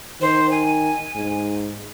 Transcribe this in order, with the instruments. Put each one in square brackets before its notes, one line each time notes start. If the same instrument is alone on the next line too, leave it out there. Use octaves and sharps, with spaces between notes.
[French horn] D#3 [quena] C5
[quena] G#5
[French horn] G#2